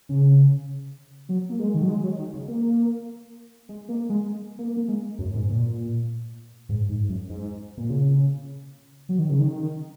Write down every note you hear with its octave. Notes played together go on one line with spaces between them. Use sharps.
C#3
F#3
A#3
G#3
D#3
F#3
G#3
F#3
D#3
C#3
A#3
G#3
A#3
G#3
A#3
A#3
G#3
F#2
G#2
A#2
G#2
G#2
F#2
G#2
A#2
C#3
F#3
D#3
C#3
D#3